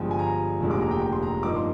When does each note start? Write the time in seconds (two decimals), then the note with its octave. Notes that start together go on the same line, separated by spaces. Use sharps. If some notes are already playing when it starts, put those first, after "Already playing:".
Already playing: G1 G2 F3 G#3 G5
0.11 G#5
0.19 A#5
0.60 F1 D#2 D3 G#3
0.71 D6
0.81 A#5
0.91 G5
1.02 G5
1.13 C6
1.23 A#5
1.43 G2 F3 A#3 D#4 D6
1.56 C6